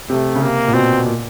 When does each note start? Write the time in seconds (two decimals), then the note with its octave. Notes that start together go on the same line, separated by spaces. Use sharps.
0.10 C3 A3
0.35 C#3
0.42 C3 A#3
0.68 A#2
0.74 B2 C4
1.06 A#2